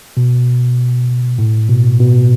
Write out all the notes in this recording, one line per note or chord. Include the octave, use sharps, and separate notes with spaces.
B2
A2
B2
B2